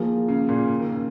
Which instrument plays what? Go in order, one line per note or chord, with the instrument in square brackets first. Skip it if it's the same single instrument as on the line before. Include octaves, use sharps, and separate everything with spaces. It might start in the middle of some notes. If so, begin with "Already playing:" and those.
Already playing: [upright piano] D#3 [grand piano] F3 A#3 F4 G#4
[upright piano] C#3
A#2
C#3
D#3
C#3